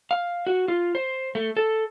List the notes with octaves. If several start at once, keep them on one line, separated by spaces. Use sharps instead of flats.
F5
F#4
F4
C5
A3
A4